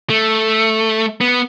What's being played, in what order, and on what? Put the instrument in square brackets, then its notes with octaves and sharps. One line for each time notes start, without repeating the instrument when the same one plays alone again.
[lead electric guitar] A3
B3